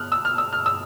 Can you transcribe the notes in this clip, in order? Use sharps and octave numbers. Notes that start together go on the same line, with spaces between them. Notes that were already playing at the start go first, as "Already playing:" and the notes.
Already playing: F6 F#6
E6
F6
E6
F6
E6